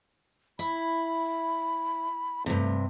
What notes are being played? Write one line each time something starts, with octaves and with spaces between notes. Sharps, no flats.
E4 B5
G2 C3 A3